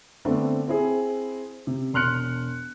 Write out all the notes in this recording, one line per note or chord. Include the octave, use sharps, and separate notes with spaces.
D3 A3 B3 C4 D4
C4 E4 G#4
C3
E1 C6 F6 F#6 C#7